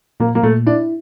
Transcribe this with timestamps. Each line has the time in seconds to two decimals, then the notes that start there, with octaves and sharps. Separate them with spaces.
0.20 A#2 A#3
0.35 A#3
0.43 A#2 A3
0.66 D4 E4